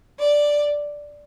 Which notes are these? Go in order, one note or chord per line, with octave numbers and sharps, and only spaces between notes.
D5